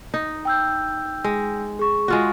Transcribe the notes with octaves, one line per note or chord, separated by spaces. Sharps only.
D#4
G5 E6 G6
G#3
G#4 C#6
G#3 F4 F#4